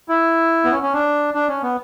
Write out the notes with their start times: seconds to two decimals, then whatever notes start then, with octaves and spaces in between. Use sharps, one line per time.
0.09 E4
0.64 B3
0.72 C#4
0.82 C#4
0.93 D4
1.34 D4
1.48 C#4
1.63 B3